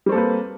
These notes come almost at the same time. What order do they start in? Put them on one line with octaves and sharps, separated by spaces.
G3 C4 A4 A#3 B4